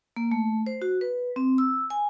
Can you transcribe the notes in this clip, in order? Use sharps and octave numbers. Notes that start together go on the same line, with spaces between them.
A#3
A3
C5
F#4
B4
C4
E6
G#5